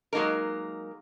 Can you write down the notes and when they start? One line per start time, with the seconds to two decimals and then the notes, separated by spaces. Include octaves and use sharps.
0.13 F#3 G#3 A#3 D#4 A#4